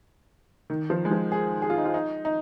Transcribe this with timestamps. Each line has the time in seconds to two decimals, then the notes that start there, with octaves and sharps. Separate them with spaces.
0.70 D#3
0.90 F3
1.05 G#3
1.11 F3
1.32 G#4
1.62 G#4
1.70 F4
1.78 D#4
1.85 F4
1.94 D#4
2.25 D#4